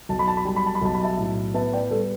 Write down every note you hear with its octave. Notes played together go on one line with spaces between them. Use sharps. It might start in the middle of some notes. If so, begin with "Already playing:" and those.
B1 A5
B5
A5
B5
G3 A5
B5
A5
B5
B1 A5
B5
E5 A5
A2
B3 E5 A5
D5 G5
G3 A4